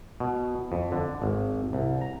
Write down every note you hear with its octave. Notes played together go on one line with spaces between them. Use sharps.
B2
F2
D3
G#1
C2
A#5